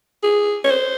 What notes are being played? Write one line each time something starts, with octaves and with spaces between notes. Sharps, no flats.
G#4
C#5
C5